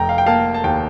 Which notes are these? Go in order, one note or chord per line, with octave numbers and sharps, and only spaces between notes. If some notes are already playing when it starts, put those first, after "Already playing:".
Already playing: F1 G5 A#5
F5
G5
A#3 F5 A5
A5
D#2 G5